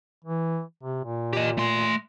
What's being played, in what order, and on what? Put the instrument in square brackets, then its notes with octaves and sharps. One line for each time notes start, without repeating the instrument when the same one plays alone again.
[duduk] E3
C3
A#2
[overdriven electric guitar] G4 D#5
A3 C6